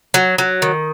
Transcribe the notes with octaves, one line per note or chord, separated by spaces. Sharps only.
F#3
F#3
D#3